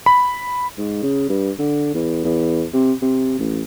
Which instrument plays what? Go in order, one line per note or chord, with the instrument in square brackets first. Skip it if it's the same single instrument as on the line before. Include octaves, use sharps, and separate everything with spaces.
[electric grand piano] B5
[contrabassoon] G#2
C#3
G2
D3
E2
E2
C3
C3
A1